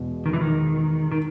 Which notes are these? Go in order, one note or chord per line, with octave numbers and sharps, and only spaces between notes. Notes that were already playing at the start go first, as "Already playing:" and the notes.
Already playing: E2 B2 G#3
D#3
E3
D#3
D#3